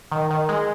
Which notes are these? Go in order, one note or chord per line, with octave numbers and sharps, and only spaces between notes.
D#3
D#3
G#3